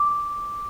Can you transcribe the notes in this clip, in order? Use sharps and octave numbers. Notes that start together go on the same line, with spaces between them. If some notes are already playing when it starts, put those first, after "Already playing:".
Already playing: D6